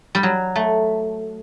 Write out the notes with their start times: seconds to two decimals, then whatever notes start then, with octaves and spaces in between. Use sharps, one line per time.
0.15 G3
0.23 F#3
0.56 A3